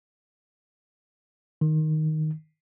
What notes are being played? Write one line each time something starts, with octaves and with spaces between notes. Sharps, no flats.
D#3